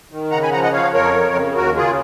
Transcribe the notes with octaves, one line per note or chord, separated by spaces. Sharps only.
D#3
C#3 F#5 A#5
G#5 B5
F3 F#5 A#5
D#5 F#5
F3 C#5 F5
F2 A#4 C#5
F3
C#3
D#2 F#4 A#4
C#3 F4 G#4